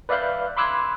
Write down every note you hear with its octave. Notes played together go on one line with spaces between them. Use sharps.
B4 D5 E5 F5 F#6 G6
B5 C6 D6 E6 F#6 G#6